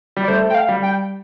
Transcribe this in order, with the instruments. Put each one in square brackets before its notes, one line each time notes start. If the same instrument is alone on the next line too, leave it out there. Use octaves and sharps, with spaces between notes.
[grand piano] G3
[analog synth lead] D5
[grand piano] A3 [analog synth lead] C5
[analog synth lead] G5
F5
[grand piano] G3
[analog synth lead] G5